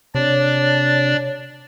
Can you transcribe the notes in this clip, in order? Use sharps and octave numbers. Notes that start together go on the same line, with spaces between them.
C3 D4 C#5 D5